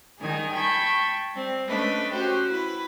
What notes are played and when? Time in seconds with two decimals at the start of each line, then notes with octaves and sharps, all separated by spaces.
0.20 D#3 G3 D#4 G#4 G#5
0.53 G5 A5 B5 C#6 G#6
1.34 G3 C4
1.67 A3 C#4 D4 B4 D#5
2.12 C#4 F#4 G4 C5
2.48 E4 B4